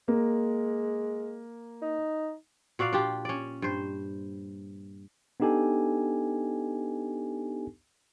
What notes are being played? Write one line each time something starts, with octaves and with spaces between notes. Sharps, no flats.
G#3 A#3
D#4
A#2 F#4 D5 F5
D4 F4 G4
C#4 D5
G2 C5
B3 D4 D#4 G4 A4 G#5